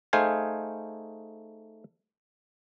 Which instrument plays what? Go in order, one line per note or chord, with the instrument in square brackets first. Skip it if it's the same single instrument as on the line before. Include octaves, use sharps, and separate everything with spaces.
[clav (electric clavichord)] A3 D#4 G#4 C5 F5 G#5